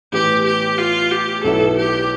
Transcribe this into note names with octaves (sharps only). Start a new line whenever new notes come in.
A2 E3 B3 G4
G4
F4
G4
B1 B2 B3 E4 A4
G4